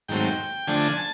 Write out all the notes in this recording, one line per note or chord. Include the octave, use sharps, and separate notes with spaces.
G#2 D#3 F#3 A3 C4 G5
D3 F3 A3 D4 G#5
A5